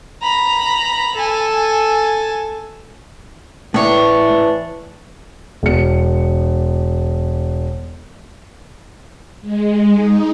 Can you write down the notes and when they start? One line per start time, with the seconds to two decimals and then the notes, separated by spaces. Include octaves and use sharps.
0.22 A#5 B5
1.16 A4 G#5
3.74 A2 E3 D4 C#5
5.63 E1 C#7
9.41 G#3
9.95 D#4